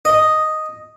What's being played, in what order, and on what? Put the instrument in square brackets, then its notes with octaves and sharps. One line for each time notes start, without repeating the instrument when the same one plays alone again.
[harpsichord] D#5